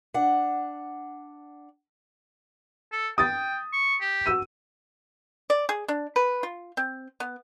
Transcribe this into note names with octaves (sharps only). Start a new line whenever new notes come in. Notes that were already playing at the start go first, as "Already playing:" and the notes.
D4 F#5
A4
G5 D#6 A6
C#6
G4
F#4 E6 D#7
D5
G#4
D4
B4
F4
C4
B3